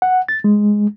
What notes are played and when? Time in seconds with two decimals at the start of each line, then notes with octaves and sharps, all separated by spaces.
0.02 F#5
0.28 A6
0.44 G#3